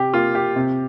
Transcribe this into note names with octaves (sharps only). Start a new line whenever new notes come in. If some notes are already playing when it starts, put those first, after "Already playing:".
Already playing: C3 G4
A#3 F4
G4
C3